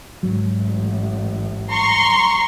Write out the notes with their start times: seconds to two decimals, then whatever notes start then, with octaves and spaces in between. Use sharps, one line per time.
0.23 G#2 F#3
0.56 A1
1.71 A#5 C6 C#6